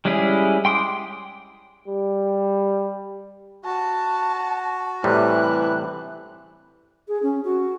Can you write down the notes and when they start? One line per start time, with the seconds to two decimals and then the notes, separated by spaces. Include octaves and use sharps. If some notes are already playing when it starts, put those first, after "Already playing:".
0.05 G3 G#3 C#4 E4 G#4
0.65 G5 C6 D6 D#6
1.87 G3
3.65 F#4 A5
5.04 A2 C3 E3 G3 F#6
7.07 G#4
7.22 C#4
7.44 F#4